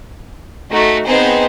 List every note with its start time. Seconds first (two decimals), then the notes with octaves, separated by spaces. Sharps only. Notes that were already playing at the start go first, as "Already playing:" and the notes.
0.71 A3 D#4 F#4
1.05 B3 C4 D#4 G#4 C5